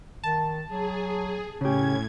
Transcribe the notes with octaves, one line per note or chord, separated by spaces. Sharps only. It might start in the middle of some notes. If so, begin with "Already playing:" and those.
D#3 A5
F#3 G#4
A2 C#3 C#4 G4 G#6